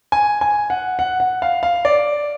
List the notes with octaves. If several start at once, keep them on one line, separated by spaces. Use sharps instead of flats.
G#5
G#5
F#5
F#5
F#5
F5
F5
D5